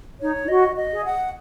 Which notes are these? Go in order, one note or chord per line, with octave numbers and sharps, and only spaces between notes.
D#4 C#5
D#4
F#4 D#5
D#5
G#4
F#5